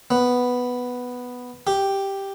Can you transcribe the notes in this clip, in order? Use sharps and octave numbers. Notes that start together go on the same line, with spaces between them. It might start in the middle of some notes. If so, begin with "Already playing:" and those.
B3
G4